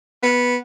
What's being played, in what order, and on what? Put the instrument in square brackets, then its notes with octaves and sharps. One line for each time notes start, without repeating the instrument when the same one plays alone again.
[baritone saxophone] B3